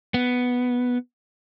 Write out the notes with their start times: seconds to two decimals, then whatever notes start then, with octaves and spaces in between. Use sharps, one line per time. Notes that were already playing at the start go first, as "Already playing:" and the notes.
0.14 B3